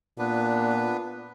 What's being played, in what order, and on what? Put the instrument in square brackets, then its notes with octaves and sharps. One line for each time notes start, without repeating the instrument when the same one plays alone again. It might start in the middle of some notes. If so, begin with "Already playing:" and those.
[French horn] A#2 [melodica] B3 D4 B4